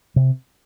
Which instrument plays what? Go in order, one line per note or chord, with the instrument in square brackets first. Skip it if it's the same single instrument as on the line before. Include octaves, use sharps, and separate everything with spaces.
[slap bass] C3